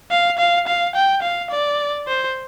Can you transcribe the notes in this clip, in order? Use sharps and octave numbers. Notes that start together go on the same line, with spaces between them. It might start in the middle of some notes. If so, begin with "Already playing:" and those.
F5
F5
F5
G5
F5
D5
C5